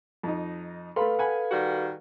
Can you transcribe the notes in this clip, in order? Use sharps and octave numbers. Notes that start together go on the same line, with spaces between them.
F2 D#4
A3 A4 B4 F5 B5 C6
F#5 G#5 B5
D#3 G3 F#4